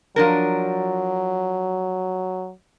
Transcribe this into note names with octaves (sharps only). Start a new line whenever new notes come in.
F3 F#3 D4 A#4